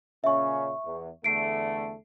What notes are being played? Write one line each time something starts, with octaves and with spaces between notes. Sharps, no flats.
A#2 C#3 C#4 E5 C#6
E2
E2 D3 A3 C7 D7